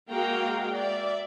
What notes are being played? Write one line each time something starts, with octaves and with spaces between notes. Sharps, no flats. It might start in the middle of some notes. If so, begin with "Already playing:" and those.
G#3 A#3 F#4 F5 G5 A#5
D5 E5